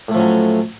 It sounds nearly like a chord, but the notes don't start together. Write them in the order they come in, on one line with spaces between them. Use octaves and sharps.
A2 A3 F3 C#4 F#3